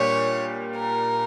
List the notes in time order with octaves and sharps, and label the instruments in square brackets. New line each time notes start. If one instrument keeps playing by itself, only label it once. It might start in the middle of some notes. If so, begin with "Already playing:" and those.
Already playing: [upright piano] A#2 G3 D4 G4 [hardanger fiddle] C#5
[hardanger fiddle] A#4